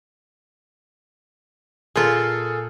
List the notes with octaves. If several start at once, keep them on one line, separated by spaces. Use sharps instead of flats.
A#2 F4 G#4 A4